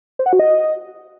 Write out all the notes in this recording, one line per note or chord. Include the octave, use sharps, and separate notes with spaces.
C5
F#5
F#4
D#5